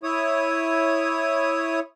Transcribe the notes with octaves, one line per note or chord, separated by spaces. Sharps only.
E4 C#5 D#6